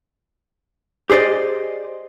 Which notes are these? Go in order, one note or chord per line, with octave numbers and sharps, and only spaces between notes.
G4 G#4 C5 D5 D#5